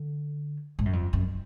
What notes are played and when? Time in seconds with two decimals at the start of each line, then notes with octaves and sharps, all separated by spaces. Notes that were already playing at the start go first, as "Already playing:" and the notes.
Already playing: D3
0.79 G#2
0.85 F#2
0.93 F2
1.13 F#2